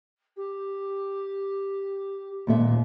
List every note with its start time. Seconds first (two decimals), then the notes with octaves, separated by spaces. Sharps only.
0.37 G4
2.47 D#2 A#2 E5